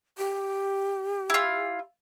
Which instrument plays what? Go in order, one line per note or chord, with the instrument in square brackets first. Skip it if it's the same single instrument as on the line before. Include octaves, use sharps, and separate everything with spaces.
[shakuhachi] G4
[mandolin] E4 F4